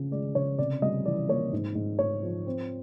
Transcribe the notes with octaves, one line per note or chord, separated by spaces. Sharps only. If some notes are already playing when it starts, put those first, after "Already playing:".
Already playing: C#3 F3
G#3 D5
C#3 C#5
C3 D5
G3 D#5
E3 D5
A#3 C#5
G#2
G#2
G#2 C#5
F3
C4